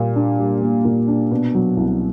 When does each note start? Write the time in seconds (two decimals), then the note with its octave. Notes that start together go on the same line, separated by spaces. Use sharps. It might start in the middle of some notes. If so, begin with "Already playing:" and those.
Already playing: A#2 G3 A#3
0.16 D4
0.40 G3
0.62 A#3
0.85 A#2
1.08 D4
1.32 B2
1.55 F#3
1.77 C2